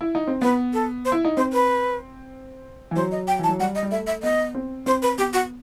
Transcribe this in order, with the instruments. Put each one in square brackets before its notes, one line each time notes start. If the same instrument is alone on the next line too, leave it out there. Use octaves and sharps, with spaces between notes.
[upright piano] E4
D#4
C4
[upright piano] B3 [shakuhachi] B4
[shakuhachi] A4
C5
[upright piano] E4
D#4
[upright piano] C4 [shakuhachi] C5
[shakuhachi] B4
[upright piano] E3
[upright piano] F#3 [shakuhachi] C5
[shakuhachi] D#5
G5
[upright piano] E3 [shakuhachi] A5
[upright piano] F#3
[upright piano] G3 [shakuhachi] F#5
[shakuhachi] D#5
[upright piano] G3
[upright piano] A3 [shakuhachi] E5
[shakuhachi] E5
[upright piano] B3 [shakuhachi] D#5
[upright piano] C4
[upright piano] C4 [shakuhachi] C5
[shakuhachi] B4
[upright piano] B3 [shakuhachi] G4
[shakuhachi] F#4